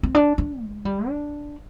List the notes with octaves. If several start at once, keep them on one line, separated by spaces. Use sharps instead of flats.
C4
D4
D4
G#3
G3
D4